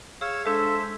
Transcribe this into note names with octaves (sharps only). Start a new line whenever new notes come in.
G#4 C#5 F5 E6
G#3 D4 A4 C5 E5